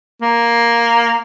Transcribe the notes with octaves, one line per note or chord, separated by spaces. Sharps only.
A#3